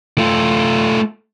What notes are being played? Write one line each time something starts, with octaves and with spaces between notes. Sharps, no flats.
A3 F4